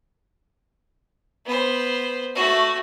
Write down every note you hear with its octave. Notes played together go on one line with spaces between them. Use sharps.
B3 C5
A3 F#4